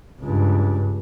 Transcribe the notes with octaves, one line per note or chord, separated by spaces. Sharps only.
C#2 G2